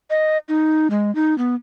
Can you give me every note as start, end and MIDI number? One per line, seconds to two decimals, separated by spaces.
0.10 0.38 75
0.49 0.88 63
0.90 1.13 56
1.15 1.37 63
1.38 1.55 59